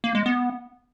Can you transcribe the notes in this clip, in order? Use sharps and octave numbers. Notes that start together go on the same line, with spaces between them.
A#3
G#3
B3